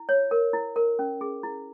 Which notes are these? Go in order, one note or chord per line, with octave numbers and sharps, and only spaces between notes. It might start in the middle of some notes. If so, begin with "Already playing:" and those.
Already playing: E4
C#5
A#4
E4
A#4
C#4
G#4
E4